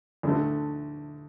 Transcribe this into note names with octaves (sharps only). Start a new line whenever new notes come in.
D2 D3 A3